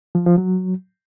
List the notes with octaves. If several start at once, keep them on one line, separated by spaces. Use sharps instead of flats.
F3
F3
F#3